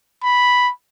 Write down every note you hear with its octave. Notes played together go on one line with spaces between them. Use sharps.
B5